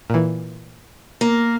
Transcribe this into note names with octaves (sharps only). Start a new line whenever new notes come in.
A#2 E3
A#3